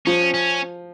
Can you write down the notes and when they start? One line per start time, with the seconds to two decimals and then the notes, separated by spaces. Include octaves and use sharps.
0.06 F3 C#4
0.34 C#4